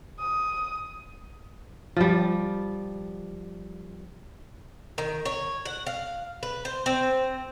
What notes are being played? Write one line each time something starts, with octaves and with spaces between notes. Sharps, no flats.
D#6
F3 G3
D#3
C#5
F#5
F5
B4
C5
C4